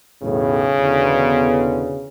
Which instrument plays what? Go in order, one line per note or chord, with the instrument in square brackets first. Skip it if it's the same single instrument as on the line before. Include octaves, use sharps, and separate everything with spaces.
[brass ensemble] B1 E2 A2 [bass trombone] C#3
[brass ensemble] E2 B2 D3